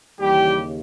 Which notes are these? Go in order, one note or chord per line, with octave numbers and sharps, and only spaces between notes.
D#2 C#3 E3 G3 G4